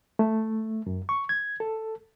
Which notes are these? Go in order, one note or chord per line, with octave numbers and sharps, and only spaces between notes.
A3
F#2
C#6
G#6
A4